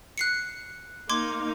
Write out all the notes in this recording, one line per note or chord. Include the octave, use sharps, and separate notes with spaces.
F#6 C7 C#7
A#3 D#4 C6 D6 G#6